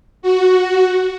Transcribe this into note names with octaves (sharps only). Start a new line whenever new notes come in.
F#4